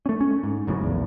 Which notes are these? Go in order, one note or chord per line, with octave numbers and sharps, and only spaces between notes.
A3 C#4
C#4
G#2
F#1 F#2 A2 C#3
A#1 E2